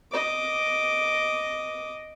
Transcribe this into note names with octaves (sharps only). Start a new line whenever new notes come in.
D#5 D6